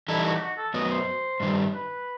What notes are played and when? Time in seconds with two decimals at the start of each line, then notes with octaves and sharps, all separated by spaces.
0.08 E3 G3 D#4 E4 A4
0.24 F#4
0.36 G4
0.41 F#4
0.57 A4
0.74 F#2 F#3 B3 D#5
0.90 C5
1.40 G2 D#3 G3
1.74 B4